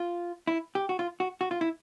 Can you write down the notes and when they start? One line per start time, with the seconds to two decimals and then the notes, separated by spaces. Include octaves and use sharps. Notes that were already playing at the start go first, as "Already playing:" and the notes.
Already playing: F4
0.47 E4
0.75 G4
0.89 F#4
0.99 F4
1.20 F#4
1.41 F#4
1.51 F4
1.61 E4